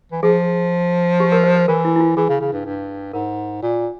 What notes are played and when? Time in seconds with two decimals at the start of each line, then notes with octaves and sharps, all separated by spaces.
0.12 E3
0.23 F3 G#4
1.20 G4
1.32 A#4
1.44 C5
1.56 C5
1.68 E3 A#4
1.85 E4
1.96 E4
2.01 F4
2.17 E3 G#4
2.29 C#3
2.41 C#3
2.53 G2
2.65 G2
3.13 G#2 A#4
3.63 A#2